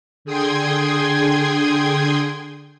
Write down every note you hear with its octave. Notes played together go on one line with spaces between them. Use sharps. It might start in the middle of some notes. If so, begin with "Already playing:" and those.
D3 G#4 G5 C6 D#6 G#6